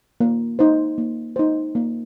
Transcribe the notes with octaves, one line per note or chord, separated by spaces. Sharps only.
A#3
D#4 C5
A#3
D#4 C5
A#3